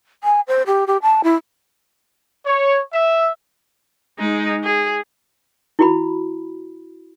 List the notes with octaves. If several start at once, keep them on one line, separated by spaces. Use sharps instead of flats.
G#5
C5
G4
G4
A5
E4
C#5
E5
G#3 D#4
G#4
E4 F#4 B5